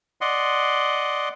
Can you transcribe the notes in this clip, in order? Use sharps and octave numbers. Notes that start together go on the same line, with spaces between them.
D5 D#5 F#5 C6